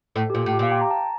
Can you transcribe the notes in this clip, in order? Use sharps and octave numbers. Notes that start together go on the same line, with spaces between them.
A2 A4
G4
A#2 F4
A2
G4
A#2 F5
G5
A#5
A5